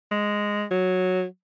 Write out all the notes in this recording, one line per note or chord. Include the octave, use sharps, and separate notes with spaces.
G#3
F#3